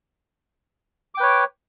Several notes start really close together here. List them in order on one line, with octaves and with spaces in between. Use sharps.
D6 G5 B4 C#5